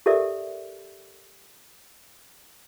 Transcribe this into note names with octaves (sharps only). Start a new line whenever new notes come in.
G4 A4 A#4 D5 E5